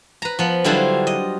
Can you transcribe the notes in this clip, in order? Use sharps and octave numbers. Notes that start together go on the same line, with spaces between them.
B4 A#5
F3 B3
D3 F#3 G3 E4 F4 C5
D#5